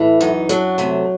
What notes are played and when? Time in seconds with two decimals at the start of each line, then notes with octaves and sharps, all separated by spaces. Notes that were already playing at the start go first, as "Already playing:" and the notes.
Already playing: A2 E3
0.21 F#2 D#4
0.49 F#3 D4
0.78 C3 A3